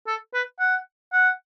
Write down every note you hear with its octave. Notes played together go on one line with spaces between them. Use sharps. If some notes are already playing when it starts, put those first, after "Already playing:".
A4
B4
F#5
F#5